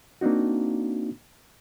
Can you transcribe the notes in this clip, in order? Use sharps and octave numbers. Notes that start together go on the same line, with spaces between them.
A#3 C4 D4 D#4 F#4